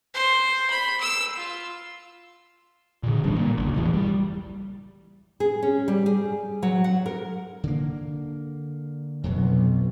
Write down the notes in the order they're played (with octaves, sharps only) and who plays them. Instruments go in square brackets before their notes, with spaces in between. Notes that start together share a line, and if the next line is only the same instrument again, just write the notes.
[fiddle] C5
B5
E6
F4
[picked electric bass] A#2 D3
D#1 A1 G3 D4
A#2
G1 C#2
E1 A#1 E3
G3
[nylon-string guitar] G#4
C#4
G3
G#4
F#3
F#5
A#4
[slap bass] D3 A#3
[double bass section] B1 [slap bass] F2 F#3